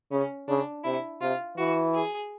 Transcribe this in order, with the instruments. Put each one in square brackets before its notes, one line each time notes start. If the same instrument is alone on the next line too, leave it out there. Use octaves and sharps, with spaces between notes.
[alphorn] C#3 [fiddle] C#4
[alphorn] C#3 [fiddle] D4
[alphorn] C3 [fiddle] E4
[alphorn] C3 [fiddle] F4
[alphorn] E3 [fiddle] F#4
[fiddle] G#4